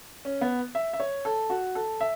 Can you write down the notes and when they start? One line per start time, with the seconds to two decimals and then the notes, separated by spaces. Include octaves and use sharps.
0.25 C#4
0.41 B3
0.75 E5
0.93 E5
1.00 C#5
1.25 A4
1.50 F#4
1.75 A4
2.01 E5